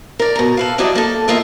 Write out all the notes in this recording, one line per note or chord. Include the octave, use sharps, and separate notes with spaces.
A#4 D5
B2 A#5
A4 B4 F5
F#3 G3 D4 E4 D5 D#5
A#3 A4
E2 E3 A#3 F4 D#5 E5